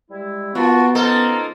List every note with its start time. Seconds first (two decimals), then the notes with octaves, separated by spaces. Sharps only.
0.11 G3 G#3 E4
0.55 A#3 B3 F4 F#4 A5
0.95 F3 A#3 C#4 D#4 F4 A4